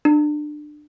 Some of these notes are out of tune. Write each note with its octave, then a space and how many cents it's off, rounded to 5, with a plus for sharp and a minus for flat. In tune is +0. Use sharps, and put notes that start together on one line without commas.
D4 +25